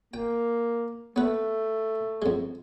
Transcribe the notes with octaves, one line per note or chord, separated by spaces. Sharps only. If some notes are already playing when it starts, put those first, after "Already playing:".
A#3 G5
A3 B3 B4
F2 G#3